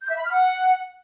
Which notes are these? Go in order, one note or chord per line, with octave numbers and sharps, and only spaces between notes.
G6
E5
B5
F6
F#5